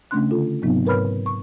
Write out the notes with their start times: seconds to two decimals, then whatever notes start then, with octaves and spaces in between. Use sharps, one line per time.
0.11 C#3 A3 C#4 D4 C6 F#6
0.31 D3 F4 A4
0.62 G#2 C3 F#3 B3 C4 D#4
0.86 G#2 A#4 B4 C#5 B5 F6
1.26 C#6